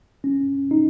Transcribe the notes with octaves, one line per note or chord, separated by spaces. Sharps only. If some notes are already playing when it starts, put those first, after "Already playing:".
C#4
D#4